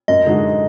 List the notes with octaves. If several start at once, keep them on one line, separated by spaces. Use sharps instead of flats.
F#2 D#5
D3 G#3 D#4 F#4